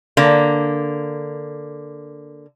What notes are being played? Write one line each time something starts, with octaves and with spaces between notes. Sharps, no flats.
D3 A#3